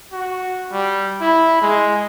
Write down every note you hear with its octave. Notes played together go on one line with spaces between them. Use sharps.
F#4
G3
E4
G#3